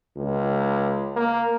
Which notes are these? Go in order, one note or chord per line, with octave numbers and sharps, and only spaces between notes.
C#2
A#3